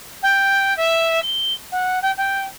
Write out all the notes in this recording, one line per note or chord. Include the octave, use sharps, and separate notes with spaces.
G5
E5
G7
F#5
G5
G5